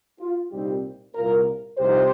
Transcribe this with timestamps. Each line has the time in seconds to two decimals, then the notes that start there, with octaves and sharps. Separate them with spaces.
0.20 F4
0.51 C2 A#2 G3 C4 D#4 G4
1.15 C2 A#2 A#3 F4 A#4
1.78 C2 C3 F3 D#4 G4 C5